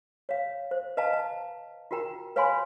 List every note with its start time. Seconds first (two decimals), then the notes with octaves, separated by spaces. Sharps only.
0.29 C#5 F5
0.71 C5
0.97 B4 D#5 F5 A5 A#5
1.13 A5
1.91 F4 F#4 A#4 G5 A#5
2.36 B4 C#5 F5 G#5 B5 C6